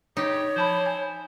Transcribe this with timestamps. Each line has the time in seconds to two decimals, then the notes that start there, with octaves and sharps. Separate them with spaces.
0.17 C#3 D#4 G4 C#5
0.56 F3 E4 C5 A5 B5
0.86 G#5